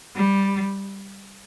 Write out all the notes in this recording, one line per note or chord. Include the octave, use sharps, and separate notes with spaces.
G3